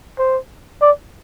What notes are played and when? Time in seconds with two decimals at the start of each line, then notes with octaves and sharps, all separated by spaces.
0.19 C5
0.82 D5